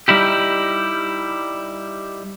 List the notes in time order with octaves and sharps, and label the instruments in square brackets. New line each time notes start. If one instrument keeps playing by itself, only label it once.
[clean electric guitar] G3 D#4 E4 G4